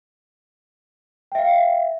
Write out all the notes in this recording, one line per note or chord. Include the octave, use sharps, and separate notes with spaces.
E5 F5 G5